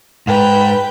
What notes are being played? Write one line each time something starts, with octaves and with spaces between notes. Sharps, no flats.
G#2 B4 G5